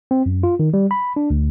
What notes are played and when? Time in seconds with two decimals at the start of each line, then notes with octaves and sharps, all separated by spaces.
0.11 C4
0.26 F#2
0.43 F4
0.60 D#3
0.74 G3
0.91 B5
1.16 D4
1.30 D2